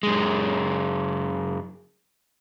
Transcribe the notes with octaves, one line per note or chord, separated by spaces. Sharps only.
F#2 G#3